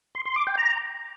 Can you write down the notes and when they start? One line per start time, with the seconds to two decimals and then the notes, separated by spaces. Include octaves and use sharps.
0.15 C6
0.25 C6
0.36 D6
0.47 G5
0.57 A#5